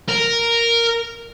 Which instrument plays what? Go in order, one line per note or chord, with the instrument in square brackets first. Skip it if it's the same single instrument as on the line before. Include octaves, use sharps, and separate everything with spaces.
[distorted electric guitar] A#4